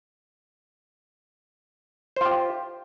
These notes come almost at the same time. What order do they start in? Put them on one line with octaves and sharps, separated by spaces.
C5 F4 G4